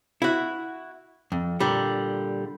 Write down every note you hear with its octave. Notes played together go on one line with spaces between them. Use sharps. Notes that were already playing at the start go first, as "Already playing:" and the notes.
E4 F#4
F2
A#2 D3 G3